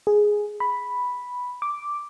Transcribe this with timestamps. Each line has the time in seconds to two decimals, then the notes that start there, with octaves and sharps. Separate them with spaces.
0.07 G#4
0.60 B5
1.62 D6